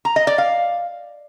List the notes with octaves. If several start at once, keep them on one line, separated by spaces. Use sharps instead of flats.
A#5
D#5
D5
F5